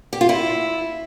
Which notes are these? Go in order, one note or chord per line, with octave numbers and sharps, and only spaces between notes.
G4
F4
E4